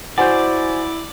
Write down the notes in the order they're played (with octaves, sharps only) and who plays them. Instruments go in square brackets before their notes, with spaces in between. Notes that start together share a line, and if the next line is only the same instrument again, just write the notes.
[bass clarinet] E4 [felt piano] F#4 C5 G#5 [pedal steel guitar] D5 [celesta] F#5 C6 G6